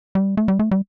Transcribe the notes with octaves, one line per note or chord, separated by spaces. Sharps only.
G3
A3
G3
A3
G3